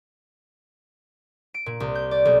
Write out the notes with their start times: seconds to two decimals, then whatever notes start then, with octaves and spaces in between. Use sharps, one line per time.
1.54 D7
1.66 A#2
1.80 C2
1.95 G6
2.11 D5
2.25 B1